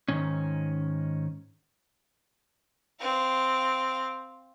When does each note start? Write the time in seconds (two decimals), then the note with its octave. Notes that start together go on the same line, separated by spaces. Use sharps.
0.08 G#2 D#3 C#4
3.00 C4 F5